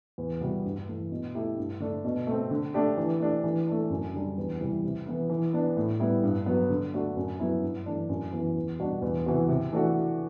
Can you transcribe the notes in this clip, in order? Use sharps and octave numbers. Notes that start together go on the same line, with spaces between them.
E2
C3 G3 B3 F#4
G2
E3 A3
B2
A3 E4 G4
G2
D3 A3 D4
B2
A3 C4
D3
A3 D4 G4
E3
A3 D4 G4
E3
A3 D4
F#2
D3 G3 D4
E2
C3 E3 G3
C3
E3 B3 E4
E3
B3 D4
A2
G3 B3 E4
G2
F#3 B3
D3
A3 D4 F#4
F#2
F#3 B3 E4
G2
E3 A3 D4
F#2
E3 B3
E2
B2 G3 D4 F#4
E2
C3 E3 B3 F#4
C3
E3 A3 D4 F#4